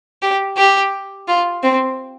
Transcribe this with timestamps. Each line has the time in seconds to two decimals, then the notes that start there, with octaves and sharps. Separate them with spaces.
0.22 G4
0.57 G4
1.28 F4
1.63 C4